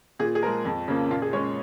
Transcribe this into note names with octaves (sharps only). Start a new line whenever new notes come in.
A#2 G#4
G#4
F3 G#3 A#4
F2
C#3 F3 A#3
A#2 F4
G#4
G#3 C#4 C#5